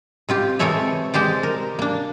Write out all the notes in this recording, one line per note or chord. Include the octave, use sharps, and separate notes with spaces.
C3 F4 G4
C3 E3 G#3 A4 C#5 E5
G#3 G4 C5 D5
A#4
A#3 D4